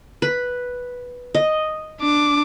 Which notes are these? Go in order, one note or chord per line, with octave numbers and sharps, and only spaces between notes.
B4
D#5
D4 D6